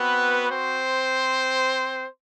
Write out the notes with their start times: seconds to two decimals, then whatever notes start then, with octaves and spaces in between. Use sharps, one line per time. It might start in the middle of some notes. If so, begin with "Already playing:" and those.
Already playing: B3 C4 F#4 B4
0.48 C4 C5